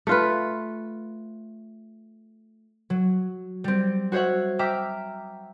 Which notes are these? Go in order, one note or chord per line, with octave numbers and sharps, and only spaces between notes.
A3 F4 B4
F#3
G3 C4
F#4 C5 C#5 E5 F#5
E5 G5 A#5 D6 F6 B6